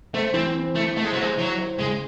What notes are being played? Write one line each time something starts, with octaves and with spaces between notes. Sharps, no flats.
A3 C5
E3 C4
C4
A3 E4
A3 C5
G#3
F#3
G#3 C5
F#3 E4
C5
C#3 G#3